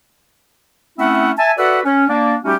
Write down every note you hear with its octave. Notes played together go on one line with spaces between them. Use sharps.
A3 C4 C#4 E4 E5 F#5
E5 G#5 A5
F#4 A4 B4 D5 E5 F#5
C#4
A#3 D4 D5
G3 A3 C#4 D#4 F#4 G4